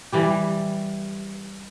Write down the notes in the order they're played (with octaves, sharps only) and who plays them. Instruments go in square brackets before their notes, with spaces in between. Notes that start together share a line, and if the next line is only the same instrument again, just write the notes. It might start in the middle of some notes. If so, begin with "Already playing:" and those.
[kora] E3 G3 G4